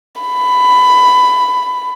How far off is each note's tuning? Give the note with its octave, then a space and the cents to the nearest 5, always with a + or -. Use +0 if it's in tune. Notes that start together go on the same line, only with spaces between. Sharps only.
B5 +15